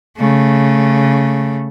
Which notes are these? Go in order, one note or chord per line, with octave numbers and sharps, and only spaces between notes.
C#3 A3